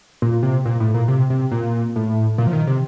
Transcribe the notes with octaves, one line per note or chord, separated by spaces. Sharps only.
A#2
C3
A#2
A2
A#2
C3
C3
A#2
A2
A#2
F3
D#3
C3